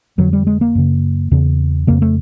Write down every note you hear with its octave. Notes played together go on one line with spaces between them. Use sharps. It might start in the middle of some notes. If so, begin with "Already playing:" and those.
F2 D3 F#3
G3
G#3
A#3
F#2 C#3
E2 C#3
F2 C#3 A#3
A3